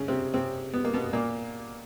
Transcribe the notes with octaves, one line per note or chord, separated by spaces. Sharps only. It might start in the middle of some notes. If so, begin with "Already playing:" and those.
Already playing: C#3 C#4
C3 C4
C3 C4
B3
A#3
B2 B3
A#2 A#3